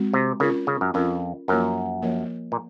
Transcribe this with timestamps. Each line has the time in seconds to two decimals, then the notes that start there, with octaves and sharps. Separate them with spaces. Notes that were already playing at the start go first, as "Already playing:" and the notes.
Already playing: G#3 C4 F#4
0.14 C3
0.40 C#3 C#4 F4 A#4
0.67 C#3
0.81 F#2
0.94 F2 C#4 F4 A#4
1.48 F#2 F3 A#3 F4 A#4 C#5
2.02 F3 A#3 F4 A#4 C#5
2.52 A#2